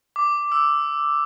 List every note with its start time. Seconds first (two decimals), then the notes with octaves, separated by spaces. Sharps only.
0.16 D6
0.52 E6